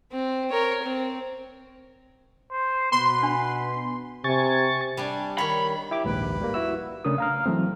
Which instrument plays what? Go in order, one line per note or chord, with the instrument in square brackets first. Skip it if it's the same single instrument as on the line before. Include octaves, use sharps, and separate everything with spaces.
[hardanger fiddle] C4
A#4 C#5
C4
[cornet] C5
[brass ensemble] B2 B3 [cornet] B4 [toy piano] B5 [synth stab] C6
[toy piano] D4 G#5 B5
[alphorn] C3 [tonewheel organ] G#5 C#6 A6
[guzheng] G3 D4 G#5
[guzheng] D#3 C#5 [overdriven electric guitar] B5
[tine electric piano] E4 G4 D6
[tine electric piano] A#1 D#2 G#2 [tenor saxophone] B4
[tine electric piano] G3 A#3
E4 F#4 E6
[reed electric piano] C#3 A3 C#4 D4 A#4 D#6
F5 A#5 F6
E3 F#3 A3 C4